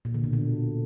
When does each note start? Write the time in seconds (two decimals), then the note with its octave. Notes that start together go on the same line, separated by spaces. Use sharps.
0.05 A#2
0.14 D3
0.24 B2
0.33 D3